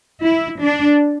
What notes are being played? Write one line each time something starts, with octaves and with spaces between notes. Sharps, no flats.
E4
D4